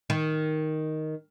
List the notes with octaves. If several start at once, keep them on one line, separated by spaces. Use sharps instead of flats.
D#3